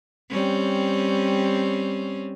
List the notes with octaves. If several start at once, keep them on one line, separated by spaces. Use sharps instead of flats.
G3 C4 C#4